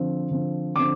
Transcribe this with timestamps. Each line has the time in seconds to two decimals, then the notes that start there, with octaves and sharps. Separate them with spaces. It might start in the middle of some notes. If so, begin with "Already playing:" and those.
Already playing: D3 F3 C4
0.30 D3 F3 C4
0.76 D3 F3 C4 D6